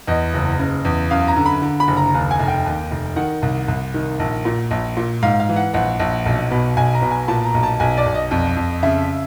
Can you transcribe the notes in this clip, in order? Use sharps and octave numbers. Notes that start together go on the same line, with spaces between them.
E2 D#5
F#1
C#3
E2
F#2 F5
A#5
D3
B5
D3
B5
F#1
A#5
D#2
G#5
F1
G5
D#2
F1
D#3 F#5
C2
C2
D#3
A#1
A#2
A#1
A#2
G#2 F5
F5
E3
F#5
A#1 F#5
A#1
B1
B2
B1 G#5
A#5
B2
G#5
A#2 A5
A#5
B1
A5
B1 G#5
D5
B1
D#5
F2
F2
C#3 E5